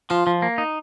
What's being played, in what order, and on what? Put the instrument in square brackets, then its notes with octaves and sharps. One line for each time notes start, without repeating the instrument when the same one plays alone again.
[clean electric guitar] F3 [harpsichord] F4
[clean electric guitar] F3
A#3
D#4